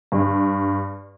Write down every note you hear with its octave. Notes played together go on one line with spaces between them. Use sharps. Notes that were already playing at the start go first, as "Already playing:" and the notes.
G2